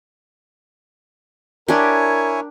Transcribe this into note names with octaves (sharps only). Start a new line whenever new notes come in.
D4 E4 G4 A#4 C#5 G#5